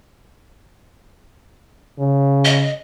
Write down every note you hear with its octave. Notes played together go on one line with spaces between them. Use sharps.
C#3
D#5